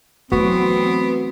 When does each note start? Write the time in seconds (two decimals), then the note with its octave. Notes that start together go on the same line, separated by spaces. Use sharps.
0.32 E3 F#3 A3 B3 C4 F#4